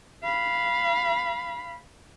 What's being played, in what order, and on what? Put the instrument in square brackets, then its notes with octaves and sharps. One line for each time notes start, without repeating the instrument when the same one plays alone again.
[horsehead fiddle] F5 B5